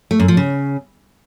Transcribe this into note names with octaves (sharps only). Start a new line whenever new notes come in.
A3
F#2
F3
C#3